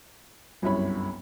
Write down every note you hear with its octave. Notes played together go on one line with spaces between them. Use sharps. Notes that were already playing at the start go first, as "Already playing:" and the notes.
G1 C2 F#2 E4 C#5 B5